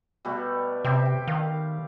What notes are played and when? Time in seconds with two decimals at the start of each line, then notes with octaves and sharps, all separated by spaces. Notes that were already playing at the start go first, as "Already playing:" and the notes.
0.25 B2 G3 A3
0.84 C3 C4 G4 E5
1.06 G5
1.28 D#3 F5